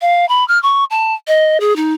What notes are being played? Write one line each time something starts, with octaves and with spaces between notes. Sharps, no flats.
F5
B5
F6
C#6
A5
D#5
G#4
D#4